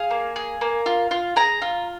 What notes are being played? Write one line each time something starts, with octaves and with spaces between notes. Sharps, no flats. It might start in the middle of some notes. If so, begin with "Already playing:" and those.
Already playing: G#4 F5
A#3
G#4
A#3
F4
F4
G#4 A#5
F4